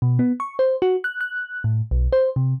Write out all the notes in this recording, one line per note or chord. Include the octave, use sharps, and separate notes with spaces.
B2
B3
C#6
C5
F#4
F#6
F#6
A2
B1
C5
C3